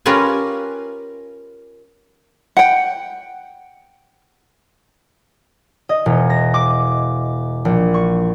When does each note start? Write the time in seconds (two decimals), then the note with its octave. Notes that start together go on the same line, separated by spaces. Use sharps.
0.06 C#4 F4 G4 A#4 B4 G#5
2.57 F#5 G5
5.89 D#5
6.06 E1
6.30 A#6
6.54 D6
7.65 A#1
7.94 C#6